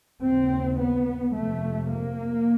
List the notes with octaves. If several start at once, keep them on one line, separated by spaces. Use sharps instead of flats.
D#2 C#3 C4
B3
F2 C3 A3
A#3